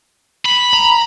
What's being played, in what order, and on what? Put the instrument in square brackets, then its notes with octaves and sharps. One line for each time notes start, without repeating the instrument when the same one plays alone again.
[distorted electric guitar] B5
[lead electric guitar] A#5